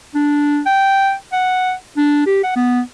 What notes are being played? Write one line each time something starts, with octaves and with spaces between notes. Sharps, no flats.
D4
G5
F#5
D4
G4
F#5
B3